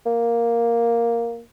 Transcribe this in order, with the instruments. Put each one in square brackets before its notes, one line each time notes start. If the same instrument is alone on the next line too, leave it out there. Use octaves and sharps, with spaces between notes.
[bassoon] A#3